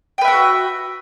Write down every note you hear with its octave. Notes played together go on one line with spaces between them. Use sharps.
F#4 B4 E5 G5